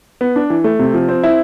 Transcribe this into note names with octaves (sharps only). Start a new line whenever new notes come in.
B3
D4
E3
A3
C3
F3
C4
E4